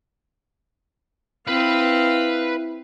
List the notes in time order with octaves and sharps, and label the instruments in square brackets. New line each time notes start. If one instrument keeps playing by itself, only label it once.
[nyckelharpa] C4 F5 [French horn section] E4 [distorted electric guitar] B4 B5